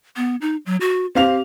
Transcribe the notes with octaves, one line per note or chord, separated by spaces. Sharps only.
B3
D#4
F#3
F#4
C4 G4 F5 F7